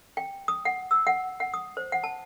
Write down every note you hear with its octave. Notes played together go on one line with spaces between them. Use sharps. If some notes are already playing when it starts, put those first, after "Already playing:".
G5
D#6
F#5
E6
F#5
F#5
D#6
C5
F#5
A5